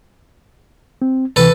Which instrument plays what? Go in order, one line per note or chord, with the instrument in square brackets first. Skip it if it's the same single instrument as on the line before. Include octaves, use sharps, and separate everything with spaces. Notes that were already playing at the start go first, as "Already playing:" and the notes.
[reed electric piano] C4
[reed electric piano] D2 C3 E3 [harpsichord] A4 B4